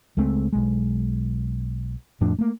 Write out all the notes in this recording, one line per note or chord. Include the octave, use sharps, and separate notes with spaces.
C#2 G#3 A3 C4
B1 G#3
F2 A2 F3 D4
A3 A#3